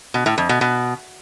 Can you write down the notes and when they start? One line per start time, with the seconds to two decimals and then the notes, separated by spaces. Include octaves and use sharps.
0.14 B2
0.26 A2
0.38 F2
0.49 B2
0.61 B2